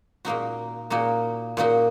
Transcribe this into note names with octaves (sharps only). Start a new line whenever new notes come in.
A#2 A#3 D#4 F#4
A#2 A#3 D#4 F#4
A#2 A#3 D#4 F#4